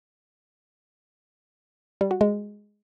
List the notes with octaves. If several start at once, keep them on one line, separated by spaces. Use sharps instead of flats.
G3
F#4
G#3